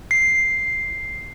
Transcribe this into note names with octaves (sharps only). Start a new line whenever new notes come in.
C7